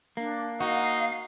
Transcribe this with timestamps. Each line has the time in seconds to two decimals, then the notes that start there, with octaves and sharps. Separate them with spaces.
0.17 A#3 D4
0.60 D#4 F#4 F5